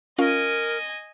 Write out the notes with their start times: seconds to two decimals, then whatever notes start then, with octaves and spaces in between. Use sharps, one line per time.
0.18 C#4 F4 A#4 D#5 F5 G#5